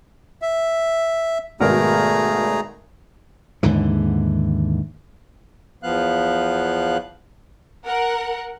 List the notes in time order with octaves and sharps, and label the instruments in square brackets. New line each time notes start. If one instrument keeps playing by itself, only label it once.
[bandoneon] E5
[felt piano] G#1 B2 A#4 [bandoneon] A3 G#4 A#5
[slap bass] D#2 G#2 D3 E3
[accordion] E2 F3 B3 F5 F#6
[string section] A#4 F#5